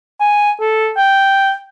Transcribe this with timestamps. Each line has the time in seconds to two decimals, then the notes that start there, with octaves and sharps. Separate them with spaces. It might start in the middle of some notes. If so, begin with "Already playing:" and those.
0.20 G#5
0.60 A4
0.97 G5